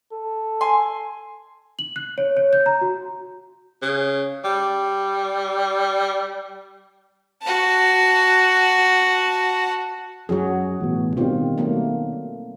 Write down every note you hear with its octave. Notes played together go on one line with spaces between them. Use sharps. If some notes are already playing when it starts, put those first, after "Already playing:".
A4
G#5 C6
F#7
F#6
C#5
C#5
G6
A#5
F#4
C#3
G3
F#4 A5
F#2 F#3 F#4 G#4
A1 B2
B2 D#3 G3 C4 F4
F#3 A3 A#3